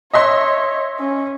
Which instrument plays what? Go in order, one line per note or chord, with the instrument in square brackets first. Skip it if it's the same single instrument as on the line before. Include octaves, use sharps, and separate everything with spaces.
[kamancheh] C#5 [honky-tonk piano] D#5 E5 C6
[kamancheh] C#4